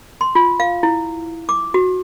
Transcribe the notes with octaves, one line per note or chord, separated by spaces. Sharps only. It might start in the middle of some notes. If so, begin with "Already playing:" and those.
C6
F4
F5
E4
D6
F#4